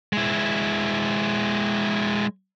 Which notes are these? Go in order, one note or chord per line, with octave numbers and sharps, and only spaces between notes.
G#3 E4